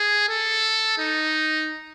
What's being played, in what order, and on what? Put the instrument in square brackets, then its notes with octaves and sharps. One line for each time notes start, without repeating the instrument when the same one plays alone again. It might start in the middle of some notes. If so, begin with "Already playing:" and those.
Already playing: [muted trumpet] G#4
A4
D#4